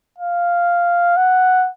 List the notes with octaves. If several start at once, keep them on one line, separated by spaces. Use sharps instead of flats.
F5
F#5